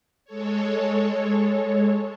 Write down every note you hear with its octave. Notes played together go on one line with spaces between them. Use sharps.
G#3 A4 C#5